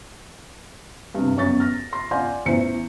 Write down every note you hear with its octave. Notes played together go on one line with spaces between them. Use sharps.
G2 C3
F#2 B3 C#5 C#6 A6
F6 A#6
C6 A#6
D5 F5 F#5 G#5 C6 G6
A1 E2 E4 C5 C#7